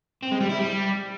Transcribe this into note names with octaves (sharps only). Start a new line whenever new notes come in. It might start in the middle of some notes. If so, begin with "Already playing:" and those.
C4
G#3
G3
E4
G3